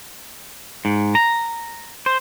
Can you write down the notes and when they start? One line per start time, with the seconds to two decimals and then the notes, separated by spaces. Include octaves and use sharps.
0.85 G#2
1.15 A#5
2.06 C5